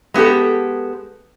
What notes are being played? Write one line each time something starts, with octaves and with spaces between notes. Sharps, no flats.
G#3 B3 E4 G4 A4